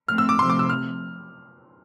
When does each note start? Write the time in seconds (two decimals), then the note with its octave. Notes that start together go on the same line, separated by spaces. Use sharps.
0.08 F3 A3 C4 F6
0.18 E6
0.29 D6
0.38 C3 F3 A3 C6
0.50 D6
0.59 E6
0.70 F6